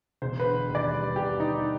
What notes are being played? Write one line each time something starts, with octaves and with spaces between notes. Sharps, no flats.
E1 C5
B4
D3
D#2
D5
G3
E1 G4
D3 D#4